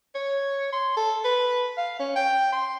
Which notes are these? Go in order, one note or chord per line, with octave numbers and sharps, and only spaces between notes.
C#5
C6
A4
B4
F5
C#4
G5
C6